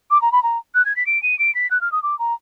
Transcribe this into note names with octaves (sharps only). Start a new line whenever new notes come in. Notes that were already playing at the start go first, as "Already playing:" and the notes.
D6
A#5
B5
A#5
F#6
G#6
B6
D7
D#7
D7
B6
F#6
F6
D#6
D6
A#5